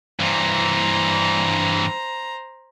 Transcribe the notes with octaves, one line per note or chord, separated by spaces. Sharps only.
G2 E3 C5 A#5